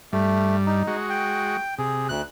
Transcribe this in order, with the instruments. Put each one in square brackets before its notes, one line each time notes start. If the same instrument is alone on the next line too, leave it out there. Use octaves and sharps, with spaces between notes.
[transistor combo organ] G2 G3 [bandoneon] A3
[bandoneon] D#4
[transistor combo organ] G#3 F#4
[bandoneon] G5
[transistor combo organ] C3 [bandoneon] G#4
[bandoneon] D2 F#6